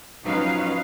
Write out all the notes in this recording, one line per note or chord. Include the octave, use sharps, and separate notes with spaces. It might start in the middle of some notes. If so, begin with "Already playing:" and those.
F3 F#3 C#4 D#4 B4 F5